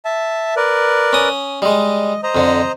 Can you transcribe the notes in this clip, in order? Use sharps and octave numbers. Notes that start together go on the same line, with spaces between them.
E5 A5
A#4 B4 D5
C#4 D#6
G3 G#3 D#5
C5 D#5 A#5
F2 D3